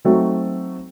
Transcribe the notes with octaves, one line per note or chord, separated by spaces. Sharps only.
F#3 A3 C4 D#4 F#4